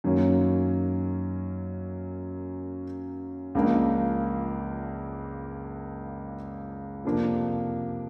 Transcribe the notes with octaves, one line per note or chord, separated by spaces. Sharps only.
F#2 D#3 F#3 A#3 C#4
C#2 C#3 F3 A#3 D4
F2 C3 F3 A#3 D4